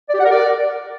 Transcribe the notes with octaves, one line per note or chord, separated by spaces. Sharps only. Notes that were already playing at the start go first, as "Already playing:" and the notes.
D5
G4
F#5
A#4
D5